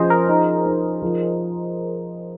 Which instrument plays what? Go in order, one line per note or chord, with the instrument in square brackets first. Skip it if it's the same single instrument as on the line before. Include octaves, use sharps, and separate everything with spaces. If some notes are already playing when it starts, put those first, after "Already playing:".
Already playing: [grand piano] F3 C#4 [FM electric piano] G#4 C5 D#5
[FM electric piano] A#4
[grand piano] D#4
D#4
F3